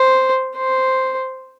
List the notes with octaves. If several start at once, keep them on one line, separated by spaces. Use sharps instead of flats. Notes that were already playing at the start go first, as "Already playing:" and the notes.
Already playing: C5
C5